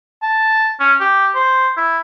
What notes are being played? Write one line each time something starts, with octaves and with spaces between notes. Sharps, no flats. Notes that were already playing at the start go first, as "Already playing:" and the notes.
A5
C#4
G4
C5
E4